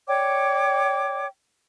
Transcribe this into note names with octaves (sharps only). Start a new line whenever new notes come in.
C#5 D5 G5 D6